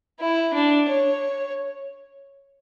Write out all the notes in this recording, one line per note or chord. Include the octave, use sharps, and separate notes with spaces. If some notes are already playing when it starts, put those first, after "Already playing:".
E4
D4
C#5